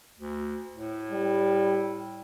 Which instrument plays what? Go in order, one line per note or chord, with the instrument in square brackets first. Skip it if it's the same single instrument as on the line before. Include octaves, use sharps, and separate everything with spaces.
[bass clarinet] D2
A2
[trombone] G3